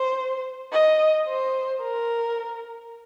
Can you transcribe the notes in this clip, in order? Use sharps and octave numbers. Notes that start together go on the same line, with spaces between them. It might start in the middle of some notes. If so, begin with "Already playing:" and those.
Already playing: C5
D#5
C5
A#4